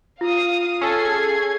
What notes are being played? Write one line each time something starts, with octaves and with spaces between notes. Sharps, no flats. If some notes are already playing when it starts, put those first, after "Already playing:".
F4 F5 D#6
C#4 G#4 A4 G#6 C7